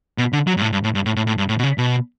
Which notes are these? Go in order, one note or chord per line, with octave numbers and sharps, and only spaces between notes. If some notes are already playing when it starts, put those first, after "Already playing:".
B2
D3
F#3
G2
A2
G2
A2
G2
A2
A2
A2
G2
A2
B2
C#3
B2